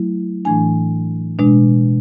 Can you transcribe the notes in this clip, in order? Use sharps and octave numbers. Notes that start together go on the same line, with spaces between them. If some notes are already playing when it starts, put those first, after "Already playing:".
Already playing: F#3 A3 E4
A2 E3 A3 D4 G#5
B2 G#3 D4